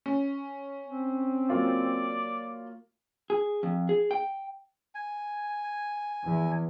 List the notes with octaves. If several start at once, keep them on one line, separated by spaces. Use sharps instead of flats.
C#4
C4
F#3 A#3 F4 D5
G#4
F2
G#4
G5
G#5
E2